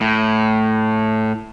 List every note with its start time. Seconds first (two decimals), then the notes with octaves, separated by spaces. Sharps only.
0.01 A2